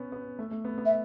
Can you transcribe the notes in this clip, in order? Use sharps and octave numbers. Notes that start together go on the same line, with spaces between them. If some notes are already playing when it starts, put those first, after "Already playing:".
Already playing: B3 C#4
B3
A3
A3
B3
B3
E5